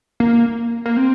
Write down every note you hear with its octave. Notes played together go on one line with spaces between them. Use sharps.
A#3
A#3
C4